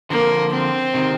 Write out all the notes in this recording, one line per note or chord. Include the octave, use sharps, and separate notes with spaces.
D3 F3 A#3
C4
C3 D#3